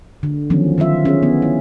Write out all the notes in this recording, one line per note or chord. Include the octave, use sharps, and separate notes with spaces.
D3
D#3 F3 F#3 B3 C#4
D#3 F#3 F4 E5
C#4 G#4
B3
E4